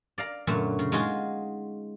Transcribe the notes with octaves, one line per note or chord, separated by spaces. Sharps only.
D5 F5 A#5
F#2 A#2 D3 F#3 A3 C#4
C#3
G#3 D#4 F4 F#4 G#4